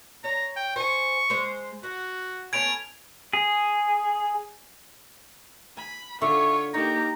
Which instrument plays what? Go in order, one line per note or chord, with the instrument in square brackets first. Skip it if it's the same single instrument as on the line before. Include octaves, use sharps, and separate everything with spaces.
[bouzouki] C#5 [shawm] A#5
[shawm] G5
[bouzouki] C5 G#5 [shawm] C#6
[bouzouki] G#3 C5
[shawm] F#4 [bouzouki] F#5
[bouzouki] A3 B3 C#4 [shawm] G#5 [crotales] G#6 D7 F7
[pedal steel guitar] G#4
[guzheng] G#5 [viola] B5
[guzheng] D3 [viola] F4 C#5 [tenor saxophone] E5 [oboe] C#6
[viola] A#3 G4 [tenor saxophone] D#4 [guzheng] C#5 [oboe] A#5